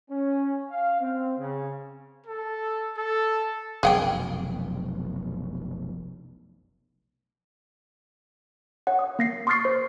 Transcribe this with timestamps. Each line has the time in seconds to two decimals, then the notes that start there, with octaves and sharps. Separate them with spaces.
0.10 C#4
0.71 F5
1.01 C4
1.39 C#3
2.26 A4
2.98 A4
3.83 F1 B1 F#2 G#4 F#5 G5
8.87 C#5 F#5
8.99 D#6
9.19 A#3 A#6 C7
9.47 C6 C#6 D#6 F6 A6 C7
9.65 C5